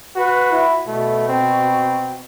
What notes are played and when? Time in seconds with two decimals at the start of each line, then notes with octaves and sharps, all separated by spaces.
0.16 F#4 B4
0.52 E4
0.87 B2 A3
1.29 C4